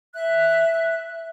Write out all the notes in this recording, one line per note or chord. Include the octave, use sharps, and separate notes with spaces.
E5 F#6